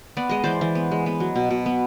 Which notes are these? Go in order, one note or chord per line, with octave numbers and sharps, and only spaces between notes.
B3 D5
G#3 D#5
E3 C5 D5
E3
B3
G#3
B3
F#3
B2
B2
B3